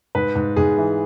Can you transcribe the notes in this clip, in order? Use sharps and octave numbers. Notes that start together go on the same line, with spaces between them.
G#2 B4
G#2
G#2 G#4
E3